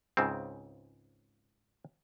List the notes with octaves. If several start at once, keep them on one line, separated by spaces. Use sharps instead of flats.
C#2 G#2 C#3 C4